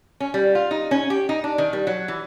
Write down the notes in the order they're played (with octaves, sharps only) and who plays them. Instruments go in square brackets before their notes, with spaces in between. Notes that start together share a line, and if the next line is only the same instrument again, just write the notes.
[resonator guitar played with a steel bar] C#4
G3
F4
D#4
C#4
G4
D#4
D4
D#3
G3
F#3
E3